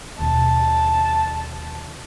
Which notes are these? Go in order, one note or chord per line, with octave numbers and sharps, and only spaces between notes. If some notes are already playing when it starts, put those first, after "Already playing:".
D#2 B2 A5